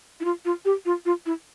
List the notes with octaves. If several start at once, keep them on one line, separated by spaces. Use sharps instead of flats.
E4
F4
F4
G4
F4
F4
E4